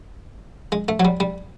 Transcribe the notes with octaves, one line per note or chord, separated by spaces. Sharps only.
G#3
A3
F#3
G3
G3